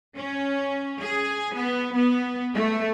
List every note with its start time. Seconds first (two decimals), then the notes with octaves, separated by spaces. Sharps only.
0.16 C#4
1.01 G#4
1.55 B3
1.96 B3
2.55 A3